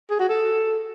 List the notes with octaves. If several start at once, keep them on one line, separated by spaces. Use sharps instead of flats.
G#4
F#4
A4